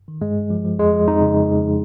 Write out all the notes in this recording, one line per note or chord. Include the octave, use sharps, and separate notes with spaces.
D#3
G2 G#3
G2
F3
F3
F2 G#3
F3
F2 D#4
C#3